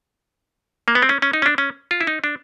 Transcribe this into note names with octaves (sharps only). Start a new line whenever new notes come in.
A#3
B3
C4
C#4
C#4
D#4
C#4
D4
C#4
F4
E4
D#4
D4